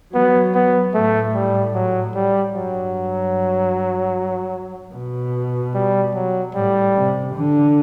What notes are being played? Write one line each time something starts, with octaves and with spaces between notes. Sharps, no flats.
F#3 B3
B3
A2 A3
G3
F#3
G3
G2 F#3
B2
G3
F#3
A2 G3
C3
D3